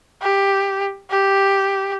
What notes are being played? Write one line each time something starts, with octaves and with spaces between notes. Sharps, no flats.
G4
G4